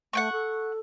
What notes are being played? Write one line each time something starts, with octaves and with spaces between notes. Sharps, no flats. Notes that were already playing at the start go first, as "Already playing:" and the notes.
A3 F#5 G5 C#6
A4